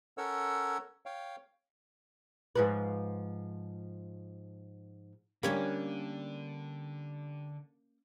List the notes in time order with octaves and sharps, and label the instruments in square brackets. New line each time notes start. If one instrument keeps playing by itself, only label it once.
[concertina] C#4 A4 A#4 C#5 F#5 E6
C#5 F5 G5
[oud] G#2 F3 B4
[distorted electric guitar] D3 [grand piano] G3 D4 G4 [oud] A#3 [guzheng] C#4 C#5 B5